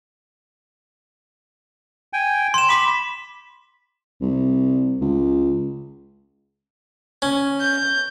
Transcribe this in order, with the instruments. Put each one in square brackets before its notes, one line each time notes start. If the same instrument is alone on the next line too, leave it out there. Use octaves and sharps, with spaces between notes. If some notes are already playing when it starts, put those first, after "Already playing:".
[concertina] G5 G#5
[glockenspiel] C6 E7
[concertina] B5 [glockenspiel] C6 D6 B6
[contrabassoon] C2
C#2
[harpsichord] C#4
[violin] G6